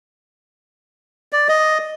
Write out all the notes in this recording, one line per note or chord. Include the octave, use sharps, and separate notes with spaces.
D5
D#5